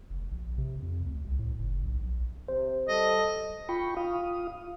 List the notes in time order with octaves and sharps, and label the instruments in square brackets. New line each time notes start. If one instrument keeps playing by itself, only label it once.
[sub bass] F1
A#1
C3
F2
D2
C2
A2
F#1
B1
A#1
[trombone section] C3 [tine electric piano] C5
[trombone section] G3 A4 [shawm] D#5
[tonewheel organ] F4 G5 B5 C#6
F4 F5 D#6